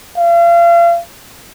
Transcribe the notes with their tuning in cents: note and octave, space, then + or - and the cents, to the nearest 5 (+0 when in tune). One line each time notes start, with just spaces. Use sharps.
F5 -35